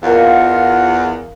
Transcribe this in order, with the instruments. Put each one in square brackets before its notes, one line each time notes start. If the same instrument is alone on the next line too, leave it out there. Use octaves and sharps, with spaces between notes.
[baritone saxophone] E2 [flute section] F4 D#5 F#5 [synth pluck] A#4 F5